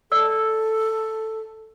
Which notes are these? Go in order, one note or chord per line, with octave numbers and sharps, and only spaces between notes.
A4 D5 E6